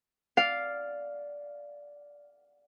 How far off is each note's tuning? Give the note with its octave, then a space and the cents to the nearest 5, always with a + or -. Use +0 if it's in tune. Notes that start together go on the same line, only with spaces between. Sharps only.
D5 -10 F5 +0